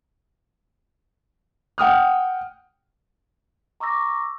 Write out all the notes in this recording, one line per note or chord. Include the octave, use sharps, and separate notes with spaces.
F#5 G5 D#6 F6
A#5 C#6 D6 E6 A#6